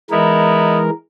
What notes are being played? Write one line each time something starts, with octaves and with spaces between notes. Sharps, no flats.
E3 G#3 B3 D#4 E4 A#4